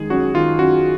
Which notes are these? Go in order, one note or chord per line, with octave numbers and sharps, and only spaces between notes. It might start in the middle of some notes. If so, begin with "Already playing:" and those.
Already playing: D#3 G#3 G#4
F#2 F#4
D#3 F4
F#2 F#4